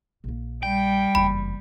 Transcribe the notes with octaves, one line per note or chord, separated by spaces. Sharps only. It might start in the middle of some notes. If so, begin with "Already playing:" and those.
A#1 A#3
G3 G5
F#1 E2 B5